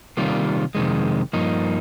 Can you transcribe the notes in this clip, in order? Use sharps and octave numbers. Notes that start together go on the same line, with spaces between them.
C3 D#3 G3 A#3 F4
F2 C3 D#3 G#3
G2 F3 A#3 D#4